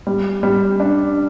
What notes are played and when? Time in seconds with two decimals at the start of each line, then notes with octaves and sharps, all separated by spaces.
0.07 G3
0.43 G3
0.80 D4